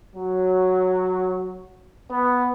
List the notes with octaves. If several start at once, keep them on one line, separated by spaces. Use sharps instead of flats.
F#3
B3